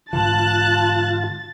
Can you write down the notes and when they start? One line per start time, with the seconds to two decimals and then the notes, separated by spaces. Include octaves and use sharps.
0.13 G#2 D3 E3 F4 A5 F#6 A6